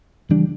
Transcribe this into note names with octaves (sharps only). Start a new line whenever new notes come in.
C#3 E3 G3 D4